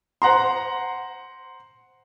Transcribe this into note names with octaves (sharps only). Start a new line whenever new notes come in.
C5 F#5 A#5 C6